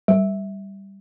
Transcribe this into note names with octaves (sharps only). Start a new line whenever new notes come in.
G3